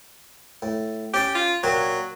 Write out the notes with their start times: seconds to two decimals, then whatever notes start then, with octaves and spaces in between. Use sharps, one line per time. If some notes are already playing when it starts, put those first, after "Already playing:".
0.62 A2
1.14 C#4 G4 A5 D6
1.35 F4
1.63 A#2 F#3 F#4 G4